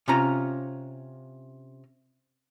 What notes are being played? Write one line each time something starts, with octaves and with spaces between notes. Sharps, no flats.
C3 C#4 F4 A#5